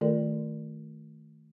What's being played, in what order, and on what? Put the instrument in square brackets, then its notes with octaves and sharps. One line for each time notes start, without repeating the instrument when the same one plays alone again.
[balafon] D#3 A3 F4 A4 A#4 D5